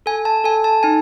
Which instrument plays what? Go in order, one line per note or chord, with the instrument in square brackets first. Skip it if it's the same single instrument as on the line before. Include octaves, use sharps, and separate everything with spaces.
[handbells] A4 G#5
A5
A4 G#5
A5
D#4 G#5